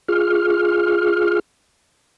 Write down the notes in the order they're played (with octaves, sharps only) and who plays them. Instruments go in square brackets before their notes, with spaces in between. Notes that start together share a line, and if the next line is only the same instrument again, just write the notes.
[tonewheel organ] F4 G#4 F6